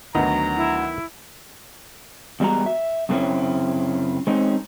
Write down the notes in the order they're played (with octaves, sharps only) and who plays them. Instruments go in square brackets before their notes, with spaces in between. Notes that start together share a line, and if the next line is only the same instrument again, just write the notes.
[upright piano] D2 F#3 [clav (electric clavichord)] D#3 B3 D#4 [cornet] A#5
[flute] E4
[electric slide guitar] E2 G3 G#3 F#4 A#5
E5
F#2 C#3 A3 C4 C#4 E4
G#3 C4 C#4 D#4